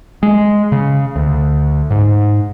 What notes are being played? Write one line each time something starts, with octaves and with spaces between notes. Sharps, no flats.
G#3
C#3
D2
G#2